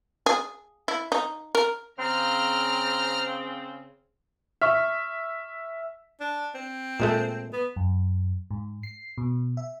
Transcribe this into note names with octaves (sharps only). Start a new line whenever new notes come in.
G#4
E4
D#4
A#4
C#3 C4 A#5 F6
E5 C#6 F6
D4
C4
A#2 G#3 A3
B3
F#2
G#2
C7
B2
E5